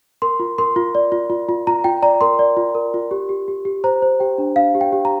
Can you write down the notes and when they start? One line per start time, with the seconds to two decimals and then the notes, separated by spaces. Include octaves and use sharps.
0.22 A#4 C6
0.40 F4
0.58 A#4 C6
0.76 F4
0.95 D5
1.12 F4
1.30 F4
1.49 F4
1.67 F4 A#5
1.84 F4 G5
2.02 D5 A#5
2.21 A#4 C6
2.39 D5
2.57 F4
2.75 A#4
2.94 F4
3.11 G4
3.29 G4
3.48 G4
3.65 G4
3.84 C5 A#5
4.02 C5
4.20 G4 G5
4.38 D4
4.56 D4 F5
4.75 G4
4.81 G5
4.92 G4
5.05 A#5